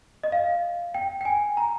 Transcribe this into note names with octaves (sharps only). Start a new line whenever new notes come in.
D#5
F5
G5
G5
G#5
A#5